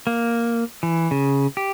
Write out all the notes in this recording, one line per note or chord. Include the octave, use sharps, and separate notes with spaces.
A#3
E3
C#3
G4